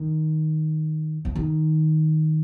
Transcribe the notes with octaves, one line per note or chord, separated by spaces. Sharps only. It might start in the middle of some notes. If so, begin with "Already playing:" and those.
Already playing: D#3
F3
D#3